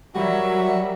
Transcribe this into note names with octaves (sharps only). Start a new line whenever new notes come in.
F#3 G3 F#4 A#4 E5